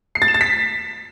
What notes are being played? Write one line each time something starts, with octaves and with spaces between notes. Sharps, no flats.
C7
A6
E7
A6
B6